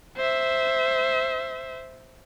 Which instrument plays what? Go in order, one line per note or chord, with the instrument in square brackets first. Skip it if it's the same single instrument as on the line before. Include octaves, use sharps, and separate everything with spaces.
[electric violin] C5 E5